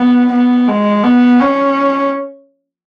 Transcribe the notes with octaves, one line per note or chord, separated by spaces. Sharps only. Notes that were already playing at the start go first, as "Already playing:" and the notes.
Already playing: B3
B3
G#3
B3
C#4